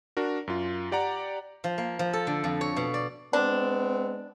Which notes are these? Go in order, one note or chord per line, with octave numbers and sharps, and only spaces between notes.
D4 F#4 A#4
F#2 F4
G4 D5 F#5 A#5
F3
A#3
F3
A4
D3
F2
C#5
B2
D5
G#3 B3 C4 D4